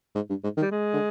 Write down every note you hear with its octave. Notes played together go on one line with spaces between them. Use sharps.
G#2
G2
G#2
D#3
G3
G#3
D3